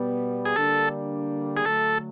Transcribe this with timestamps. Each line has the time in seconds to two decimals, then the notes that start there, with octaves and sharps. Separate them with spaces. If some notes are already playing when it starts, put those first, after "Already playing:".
Already playing: B2 G3 B3
0.45 G#4
0.56 D3 G3 A#3 D4 A4
1.57 G#4
1.65 D3 F#3 A3 A4